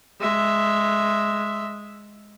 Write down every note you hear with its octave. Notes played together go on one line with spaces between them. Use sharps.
G#3 E5